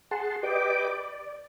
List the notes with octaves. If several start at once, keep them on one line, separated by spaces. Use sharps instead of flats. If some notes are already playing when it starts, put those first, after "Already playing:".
G#4 F#5 A5 C6
G4 B4 D5 D#5 G5 D6
D5